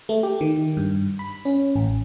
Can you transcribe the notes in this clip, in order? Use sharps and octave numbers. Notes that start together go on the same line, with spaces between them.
A3
G4
D#3
G2
B5
C#4
A1